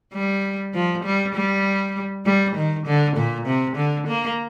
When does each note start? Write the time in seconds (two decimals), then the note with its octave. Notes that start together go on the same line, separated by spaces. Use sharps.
0.14 G3
0.74 F3
1.05 G3
1.35 G3
2.26 G3
2.55 D#3
2.86 D3
3.16 A#2
3.46 C3
3.76 D3
4.07 A#3